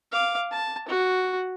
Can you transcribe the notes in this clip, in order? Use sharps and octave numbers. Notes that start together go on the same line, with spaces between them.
F5 D6
A5
F#4